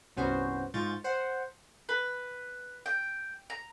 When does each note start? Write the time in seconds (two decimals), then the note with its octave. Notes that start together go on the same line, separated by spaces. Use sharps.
0.17 C2 G2 B3 C#4 F#4 C5
0.74 G#2 G#3 F4 C#6 G6 A6
1.04 C5 F#5
1.89 B4
2.86 G5
3.50 A#5